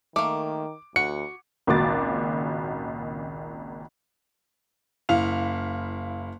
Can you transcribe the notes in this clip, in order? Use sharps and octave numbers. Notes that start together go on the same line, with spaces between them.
D#3 A3 A#3 D6
D2 F#4 C#7
G#1 C#2 A#2 F#4 D6 A6
F#1 E4 F5 F7